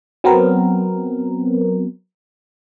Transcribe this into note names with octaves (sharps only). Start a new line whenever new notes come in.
F#3 B3 C4 A#4